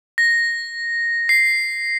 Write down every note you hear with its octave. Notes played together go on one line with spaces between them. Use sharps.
A#6
C7